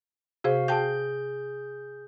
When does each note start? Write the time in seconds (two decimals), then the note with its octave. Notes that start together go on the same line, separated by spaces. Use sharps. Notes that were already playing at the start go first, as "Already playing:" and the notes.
0.44 C3 F#4 G#4 C5 F5
0.68 G#4 F5 G5 A5 G6